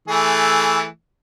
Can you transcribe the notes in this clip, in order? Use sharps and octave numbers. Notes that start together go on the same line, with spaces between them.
E3 A3 G#4